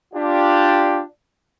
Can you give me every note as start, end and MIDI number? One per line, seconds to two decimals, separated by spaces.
0.14 1.02 62
0.14 1.02 65
0.14 1.02 67